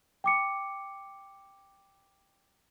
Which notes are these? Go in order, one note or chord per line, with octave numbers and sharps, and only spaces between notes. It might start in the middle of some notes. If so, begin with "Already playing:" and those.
G5 D6 C#7